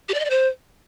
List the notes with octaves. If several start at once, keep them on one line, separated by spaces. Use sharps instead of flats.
G4
D5
D#5
D5
C5